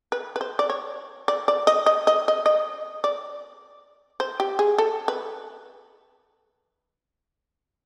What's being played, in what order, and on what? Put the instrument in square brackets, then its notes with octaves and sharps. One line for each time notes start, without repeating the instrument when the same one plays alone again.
[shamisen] B4
B4
C5
D5
C#5
D5
D5
D#5
D#5
D#5
D#5
D#5
D5
C5
G4
G#4
A4
B4